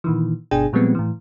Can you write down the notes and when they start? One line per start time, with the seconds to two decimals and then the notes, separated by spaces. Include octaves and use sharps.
0.04 A#2 D#3 E3
0.51 G1 B2 D4 G#4 G5 G#5
0.73 A#2 F3 G3 G#3 B3 C4
0.95 A2 E3